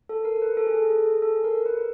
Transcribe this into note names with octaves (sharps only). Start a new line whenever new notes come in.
A4
A#4
B4
A4
G#4
A4
G#4
A4
A#4
B4